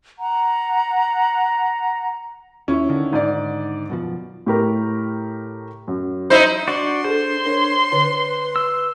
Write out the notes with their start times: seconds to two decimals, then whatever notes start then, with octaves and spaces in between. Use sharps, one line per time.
0.18 F#5 A#5
2.68 D#2 C#4 E4
2.89 D3 D#3
3.13 G#2 D5
3.90 F#2 B2 F3
4.46 A2 G4 A#4
5.88 F#2
6.30 D#4 E4 C5
6.68 D4 F#4 D5 C6
7.04 G#4 A4 C5
7.45 D4 A#4 C#5
7.92 D3 B4 C#5
8.56 E6